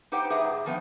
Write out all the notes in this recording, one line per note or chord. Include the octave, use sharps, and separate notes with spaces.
D#4 G4 B4 C5 F#5 G5
G#4 B4 E5 A#5
G#2
F#2 F3 B3 C4